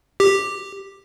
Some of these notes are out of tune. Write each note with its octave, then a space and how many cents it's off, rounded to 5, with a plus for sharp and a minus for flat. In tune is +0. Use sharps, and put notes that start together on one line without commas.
G4 +5